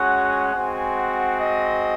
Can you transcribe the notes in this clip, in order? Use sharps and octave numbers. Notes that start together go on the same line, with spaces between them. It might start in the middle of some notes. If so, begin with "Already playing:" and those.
Already playing: G#3 C#4 F#4 F#5
G#3 C4 F#4 G#5
F#5
D#5